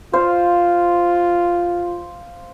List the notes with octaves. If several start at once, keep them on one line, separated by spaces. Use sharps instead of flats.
F4 C5 F5